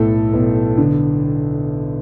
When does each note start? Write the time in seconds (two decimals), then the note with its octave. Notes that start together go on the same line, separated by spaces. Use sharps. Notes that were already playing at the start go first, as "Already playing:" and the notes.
Already playing: B1 A2 A4
0.33 B1
0.77 D3